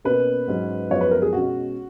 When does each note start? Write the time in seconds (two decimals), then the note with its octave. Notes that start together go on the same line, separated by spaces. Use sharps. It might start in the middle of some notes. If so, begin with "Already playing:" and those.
0.05 B2 A#3 C#4 B4
0.48 G#2 F#3 C#4
0.90 F#2 F3 G#3 B3 C#5
1.01 B4
1.11 A#4
1.22 G#4
1.33 B2 G#3 C#4 F#4